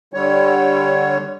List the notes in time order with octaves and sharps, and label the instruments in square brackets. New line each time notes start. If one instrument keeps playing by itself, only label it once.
[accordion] D3 G3 C#5